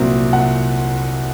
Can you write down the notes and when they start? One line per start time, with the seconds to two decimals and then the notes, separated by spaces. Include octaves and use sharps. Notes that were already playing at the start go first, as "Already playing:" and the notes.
Already playing: C2 A#2 F#3 C4
0.33 C2 F#5